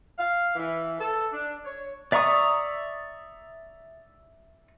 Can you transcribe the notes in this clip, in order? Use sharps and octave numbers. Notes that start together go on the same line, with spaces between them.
F5
E3
A4
D4
C#5
D5 E5 A#5 C#6 D#6